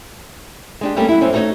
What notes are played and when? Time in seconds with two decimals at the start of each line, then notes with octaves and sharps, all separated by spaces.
0.81 G#3 D4 G4
0.96 G3 A3 A#3 C#4 G4
1.09 F#3 E4
1.21 F#2 E3 C4 C#4
1.33 A3 D#4 F#4 A#4 C#5 D#5